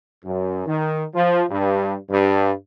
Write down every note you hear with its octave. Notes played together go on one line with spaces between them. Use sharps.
F#2
D#3
F3
G2
G2